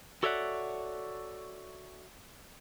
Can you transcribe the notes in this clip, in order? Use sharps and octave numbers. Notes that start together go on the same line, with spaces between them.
F#4 A4 C#5 D5 E5 F#5